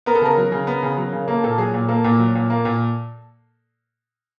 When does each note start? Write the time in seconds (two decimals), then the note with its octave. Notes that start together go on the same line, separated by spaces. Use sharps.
0.06 B3 A#4
0.15 A4
0.21 C#3 A#4
0.37 F#3
0.52 C#3
0.67 B3
0.83 C#3
0.97 F#3
1.13 C#3
1.28 A#3 A4
1.44 A#2 A4
1.58 F#3 G#4
1.74 A#2
1.88 A#3 A4
2.04 A#2
2.19 F#3
2.35 A#2
2.50 A#3
2.65 A#2